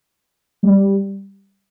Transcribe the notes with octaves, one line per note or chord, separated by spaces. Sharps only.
G3